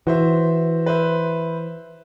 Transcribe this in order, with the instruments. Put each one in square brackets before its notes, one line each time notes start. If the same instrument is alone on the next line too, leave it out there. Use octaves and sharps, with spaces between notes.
[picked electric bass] E3 [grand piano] F#4 C5 E5
[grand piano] B4 C5 E5